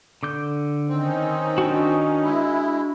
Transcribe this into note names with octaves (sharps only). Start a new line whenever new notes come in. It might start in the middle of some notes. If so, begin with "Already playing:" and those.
D3 D6 G6
D#3 C4 C#4 D#4
D4 F#4
G#3 E4